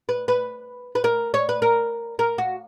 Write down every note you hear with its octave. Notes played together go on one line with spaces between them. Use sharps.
B4
B4
B4
A#4
C#5
B4
A#4
A#4
F#4